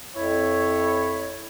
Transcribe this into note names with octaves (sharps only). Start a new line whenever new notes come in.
F2 E4 C#5